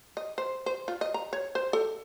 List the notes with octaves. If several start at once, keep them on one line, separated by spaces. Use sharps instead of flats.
D#5
C5
C5
F4
D#5
A#5
C#5
C5
A4